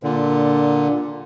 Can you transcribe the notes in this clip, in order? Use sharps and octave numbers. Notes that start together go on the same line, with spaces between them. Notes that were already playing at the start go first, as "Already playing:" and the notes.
A#2 D3